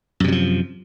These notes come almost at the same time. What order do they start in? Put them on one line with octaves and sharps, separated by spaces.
F#2 C3 F#3 F3